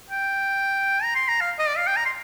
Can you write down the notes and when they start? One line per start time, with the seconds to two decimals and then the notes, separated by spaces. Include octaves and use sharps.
0.10 G5
1.03 A#5
1.16 C6
1.28 A#5
1.41 F5
1.59 D#5
1.68 D5
1.77 F5
1.87 G5
1.96 A#5
2.05 C6